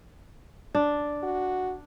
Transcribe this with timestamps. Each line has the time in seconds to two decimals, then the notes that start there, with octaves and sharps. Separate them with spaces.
0.75 D4
1.23 F#4